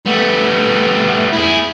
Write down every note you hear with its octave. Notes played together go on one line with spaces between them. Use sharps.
G3 A3 B3
E4 G#4